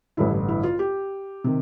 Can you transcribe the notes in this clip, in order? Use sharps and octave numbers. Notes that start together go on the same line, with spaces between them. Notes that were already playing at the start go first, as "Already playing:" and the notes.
A1 G2 D3 E4
E4
F4
G4
C3 D#3